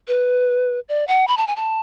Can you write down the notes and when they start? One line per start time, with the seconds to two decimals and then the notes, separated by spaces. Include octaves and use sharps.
0.08 B4
0.89 D5
1.07 F#5
1.28 B5
1.37 A5
1.47 G#5
1.56 A5